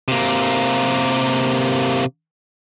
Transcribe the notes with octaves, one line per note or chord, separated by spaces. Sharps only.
C3 A#3